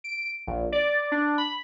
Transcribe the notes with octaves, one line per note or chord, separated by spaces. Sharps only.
D7
A#1
D5
D4
B5